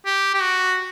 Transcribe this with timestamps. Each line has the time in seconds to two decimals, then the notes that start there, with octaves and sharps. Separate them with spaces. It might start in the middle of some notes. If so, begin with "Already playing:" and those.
0.05 G4
0.34 G4
0.42 F#4